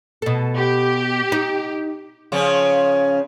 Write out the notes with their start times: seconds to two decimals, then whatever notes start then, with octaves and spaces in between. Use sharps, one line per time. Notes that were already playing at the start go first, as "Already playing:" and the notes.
0.22 B2 A4
0.56 G4
1.32 D#4
2.32 C#3 F3 C#4